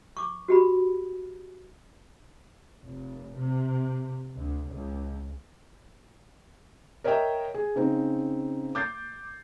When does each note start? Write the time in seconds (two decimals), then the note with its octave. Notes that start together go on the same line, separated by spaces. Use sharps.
0.17 C#6 D6
0.48 F#4 G4 B5
2.83 F1
3.36 C3
4.36 D2
4.70 C#2
7.04 A#4 C#5 D#5 E5 G5 A#5
7.54 G#4
7.76 C#3 C4 D#4
8.75 D6 G6 A6 C7